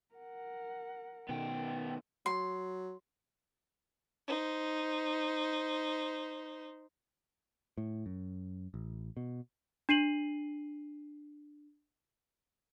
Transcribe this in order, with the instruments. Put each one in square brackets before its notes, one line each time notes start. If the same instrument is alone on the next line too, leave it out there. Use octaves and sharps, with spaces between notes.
[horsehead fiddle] A#4 F#5
[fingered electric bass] B2 D#3 [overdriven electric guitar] B3 G5
[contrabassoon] F#3 [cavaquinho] C6
[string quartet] D#4 C5
[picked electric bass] A2
F#2
A1
B2
[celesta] D4 C7 D#7 F#7